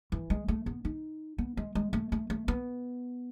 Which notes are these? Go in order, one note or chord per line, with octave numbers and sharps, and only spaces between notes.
E3
G#3
A3
B3
D#4
B3
G#3
G#3
A3
A3
A3
B3